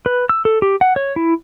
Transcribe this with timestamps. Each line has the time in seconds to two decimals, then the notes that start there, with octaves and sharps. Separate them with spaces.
0.06 B4
0.29 E6
0.45 A4
0.62 G4
0.81 F#5
0.96 C#5
1.16 E4